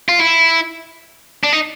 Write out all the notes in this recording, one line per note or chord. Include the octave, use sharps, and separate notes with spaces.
F4
E4
D4
D#4